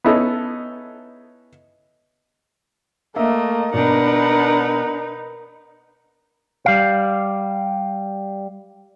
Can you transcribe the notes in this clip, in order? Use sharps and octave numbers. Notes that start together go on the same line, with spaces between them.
B3 C#4 D#4 E4 A4
A3 A#3 D#5 E5
B2 D4 D#4 A#4 B4 F#5
G3 F5